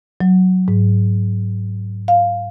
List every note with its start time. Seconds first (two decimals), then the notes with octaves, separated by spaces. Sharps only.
0.21 F#3
0.68 G#2
2.08 F5